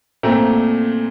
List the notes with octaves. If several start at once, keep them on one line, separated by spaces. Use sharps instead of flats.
A#2 A3 C4 A#5